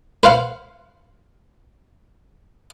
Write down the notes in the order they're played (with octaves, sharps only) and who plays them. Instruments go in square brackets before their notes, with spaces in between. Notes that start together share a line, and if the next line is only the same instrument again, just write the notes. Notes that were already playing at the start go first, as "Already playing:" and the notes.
[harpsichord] B4 C5 F5 F#5